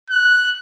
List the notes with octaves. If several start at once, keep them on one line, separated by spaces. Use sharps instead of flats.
F#6